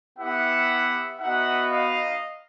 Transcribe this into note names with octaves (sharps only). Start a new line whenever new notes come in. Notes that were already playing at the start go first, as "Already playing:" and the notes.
B3 E4 G4 E5 F#5
B3 D#4 F#4 E5 F#5
D#5 F5